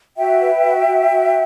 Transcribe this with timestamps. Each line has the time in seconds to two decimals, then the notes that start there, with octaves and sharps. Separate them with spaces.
0.17 F#4 E5 G5
0.41 B4
0.64 F#4
0.87 F#4
1.10 F#4